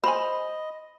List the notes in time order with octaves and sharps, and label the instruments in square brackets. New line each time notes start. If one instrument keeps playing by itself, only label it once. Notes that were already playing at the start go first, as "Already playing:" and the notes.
[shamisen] C5 G#5 [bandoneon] D#5 [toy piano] B5 C6